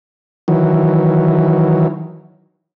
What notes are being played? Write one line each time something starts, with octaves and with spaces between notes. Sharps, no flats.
D#3 E3 F#3